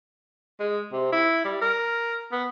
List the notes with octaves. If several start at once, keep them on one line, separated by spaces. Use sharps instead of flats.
G#3
C3
E4
G3
A#4
B3